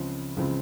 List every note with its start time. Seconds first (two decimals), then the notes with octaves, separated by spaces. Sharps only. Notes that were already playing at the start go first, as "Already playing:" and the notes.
Already playing: C#2 C#3 F3 C4
0.36 C#2 C#3 F3 C4